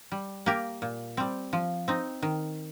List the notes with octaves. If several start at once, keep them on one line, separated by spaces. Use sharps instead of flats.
G3
A#3 G4 A#4
A#2
G3 C4
F3
C4 D#4
D#3